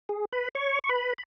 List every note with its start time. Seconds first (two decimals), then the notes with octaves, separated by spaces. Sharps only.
0.09 G#4
0.32 B4 B5
0.55 C#5 C#6
0.84 C#6
0.89 B4 B5
1.18 B5